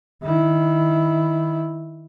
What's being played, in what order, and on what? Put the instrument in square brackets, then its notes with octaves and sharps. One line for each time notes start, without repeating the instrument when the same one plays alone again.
[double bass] D#3 E4